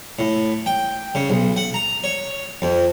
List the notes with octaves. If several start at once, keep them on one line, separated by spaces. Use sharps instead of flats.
A2
G5
C#3
B1
F#5
A#5
C#5
F2